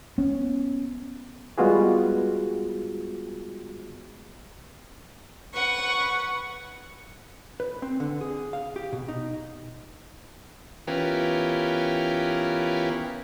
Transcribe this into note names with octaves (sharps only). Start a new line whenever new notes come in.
B3 C#4
G3 G#3 B3 F4 F#4 G#4
B4 F#5 C#6
B4
C4
D3
G#4
F5
G4
B2
D#4
E3 B3 C#4 F4 G4 A#4